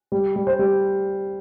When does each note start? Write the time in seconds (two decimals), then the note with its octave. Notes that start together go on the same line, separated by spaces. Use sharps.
0.12 G3
0.36 G3
0.47 C5
0.59 G3